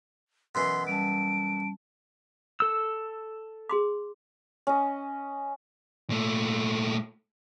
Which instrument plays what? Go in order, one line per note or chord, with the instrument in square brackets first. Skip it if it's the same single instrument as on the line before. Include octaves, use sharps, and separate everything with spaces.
[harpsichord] F#2 B2 E3 [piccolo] C6
[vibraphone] G3 C#4 A5 [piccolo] D7
[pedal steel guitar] A4 E6
[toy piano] G#4 C6 D6
[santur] C#4 D#5
[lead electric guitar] A#2 A3